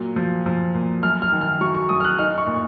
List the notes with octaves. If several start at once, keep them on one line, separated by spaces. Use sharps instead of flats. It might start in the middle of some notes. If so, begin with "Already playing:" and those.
Already playing: A#2 F#3
F3
F3
A#2
F#2 F6
F6
D#3
F6
F#3 C#6
C#6
F#2 D#6
F6
F#6
D#4 F6
C#6
A#2